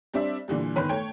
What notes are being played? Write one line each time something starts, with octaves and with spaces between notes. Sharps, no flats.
G3 C4 D4 D5 E5
A#2 D3 E3 G3
G1 D#3 B4 B5 C6
A3 C#5 G5